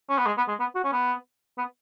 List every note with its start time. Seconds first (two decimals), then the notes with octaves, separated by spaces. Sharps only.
0.10 C#4
0.18 B3
0.26 G#3
0.37 B3
0.48 G#3
0.60 B3
0.75 F#4
0.84 C#4
0.93 B3
1.58 B3